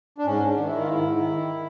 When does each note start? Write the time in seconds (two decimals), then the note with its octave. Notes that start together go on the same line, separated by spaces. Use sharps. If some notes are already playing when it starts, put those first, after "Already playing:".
0.18 D4
0.26 G#2 C#4
0.42 G#2 D4
0.57 D#3
0.67 D#3 E4
0.81 F4
0.87 G#2 E4
1.02 G#2
1.17 D#3
1.32 D#3